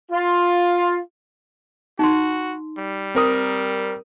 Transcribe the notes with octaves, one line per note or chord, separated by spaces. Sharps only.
F4
D#4 F#4 C6
G3
C4 A#4 D#6